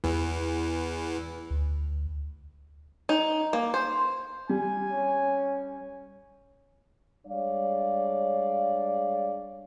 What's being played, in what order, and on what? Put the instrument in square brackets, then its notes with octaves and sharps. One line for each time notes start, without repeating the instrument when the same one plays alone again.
[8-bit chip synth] E2 E3
[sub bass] D2
[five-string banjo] D#4
A#3
C5
[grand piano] G3 [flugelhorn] G#5
[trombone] C#4
[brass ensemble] G3 G#3 D4 C#5 D5 F5